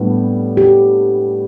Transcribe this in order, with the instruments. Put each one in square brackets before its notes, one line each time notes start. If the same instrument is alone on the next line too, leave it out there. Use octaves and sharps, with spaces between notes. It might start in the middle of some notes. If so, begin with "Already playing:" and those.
Already playing: [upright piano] A2 G3 B3 D4
[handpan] G4